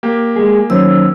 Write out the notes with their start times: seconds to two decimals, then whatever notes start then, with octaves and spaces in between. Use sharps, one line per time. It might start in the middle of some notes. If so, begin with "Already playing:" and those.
0.03 A#3 G4
0.36 G#3 G#4
0.70 D#3 F#3 C#4 C5 E6